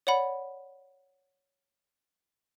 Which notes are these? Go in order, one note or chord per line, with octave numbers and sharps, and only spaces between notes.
C#5 D5 F#5 B5